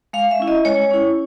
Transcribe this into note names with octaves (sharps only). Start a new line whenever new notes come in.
G#3 F5
E5
C#4 E4
D#5
G#3 C#5
C#4 E4